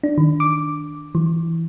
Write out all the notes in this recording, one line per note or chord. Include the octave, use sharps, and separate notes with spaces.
D4
D#3
D6
E3